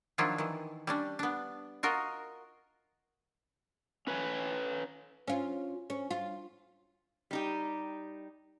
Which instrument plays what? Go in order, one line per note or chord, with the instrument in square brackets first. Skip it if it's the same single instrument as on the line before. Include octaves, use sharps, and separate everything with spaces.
[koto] D#3 F3 F#3 D4 E4 F4
D#3 E3
G3 C#4 D4
B3 D4
F4 F#4 A#4 D#5
[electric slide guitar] C#4 B4 C#5 G#5
[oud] C#4 F4
C#4
F4
[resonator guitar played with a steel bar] G3 D#4 G4